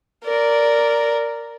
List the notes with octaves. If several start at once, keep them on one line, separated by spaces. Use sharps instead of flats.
A#4 D5